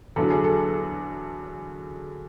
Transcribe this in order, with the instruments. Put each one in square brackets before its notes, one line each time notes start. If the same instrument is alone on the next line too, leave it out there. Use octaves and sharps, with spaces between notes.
[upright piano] E2 D3 F#3 A4
G#4
A4